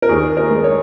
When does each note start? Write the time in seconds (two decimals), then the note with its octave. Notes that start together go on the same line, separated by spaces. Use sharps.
0.02 A#4
0.09 D#2 G#4
0.37 A#4
0.51 G#3
0.64 C#5